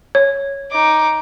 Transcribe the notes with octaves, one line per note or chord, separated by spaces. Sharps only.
C#5
D#4 D6